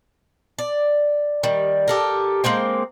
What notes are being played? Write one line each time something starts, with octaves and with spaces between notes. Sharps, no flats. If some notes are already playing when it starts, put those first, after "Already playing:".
D5
D#3 G3
G4 A4 A#4
G#3 A#3 C4 G5